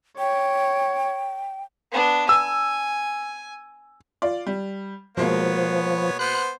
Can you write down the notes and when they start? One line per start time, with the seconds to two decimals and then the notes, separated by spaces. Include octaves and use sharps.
0.19 C#5 G5
1.92 B3 D4
2.29 G#5 E6
4.22 F4 D5
4.46 G3
5.17 B2 F3 G#3 A#3 B3 C#5
6.19 B3 C5 F#6